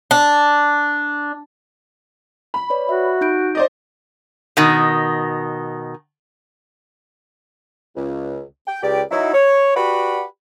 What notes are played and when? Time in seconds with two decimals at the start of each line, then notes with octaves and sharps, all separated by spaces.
0.11 D4
2.54 B5
2.70 B4 C#5 D5
2.89 F#4 E5
3.21 D#4 G6 D7
3.55 C5 D5 D#5
4.57 B2 D#3
7.96 C#2
8.67 G5
8.83 C#2 G4 D5
9.11 F#3 D#4 E4
9.34 C#5
9.76 F#4 G4 B4 D5 F#5 B5